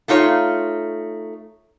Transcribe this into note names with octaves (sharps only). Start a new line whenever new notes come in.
A3 D#4 F4 C#5